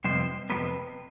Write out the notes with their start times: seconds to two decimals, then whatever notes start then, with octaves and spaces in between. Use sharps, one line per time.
0.04 F2 C3 G3 B3 C5
0.50 F2 C3 G3 B3 B4